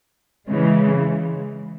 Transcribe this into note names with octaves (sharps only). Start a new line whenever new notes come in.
C#3 E3 G#3